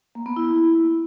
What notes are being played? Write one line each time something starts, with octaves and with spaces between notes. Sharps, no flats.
A#3
B3
E4